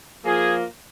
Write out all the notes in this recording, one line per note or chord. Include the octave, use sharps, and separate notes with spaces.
F3 A#3 F4 G#4